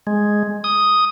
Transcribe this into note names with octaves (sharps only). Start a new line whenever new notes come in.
G#3
D#6